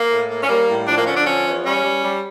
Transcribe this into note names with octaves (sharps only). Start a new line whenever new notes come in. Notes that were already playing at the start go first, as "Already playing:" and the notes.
Already playing: A#3
A2
A#3
C#4
G3 A#3
A2
F3 D4
A#3
D3 C#4
D4
F3 C#4
E2
G3 C#4
G3
G3